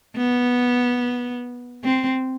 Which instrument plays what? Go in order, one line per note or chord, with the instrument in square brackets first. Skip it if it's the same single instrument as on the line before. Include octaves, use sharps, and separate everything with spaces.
[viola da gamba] B3
C4